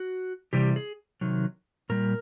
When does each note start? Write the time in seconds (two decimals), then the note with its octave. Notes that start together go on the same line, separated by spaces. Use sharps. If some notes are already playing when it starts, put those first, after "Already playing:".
Already playing: F#4
0.53 C3 E3 G3 G4
0.76 G#4
1.21 C3 D#3 F#3
1.89 A#2 G3 A#4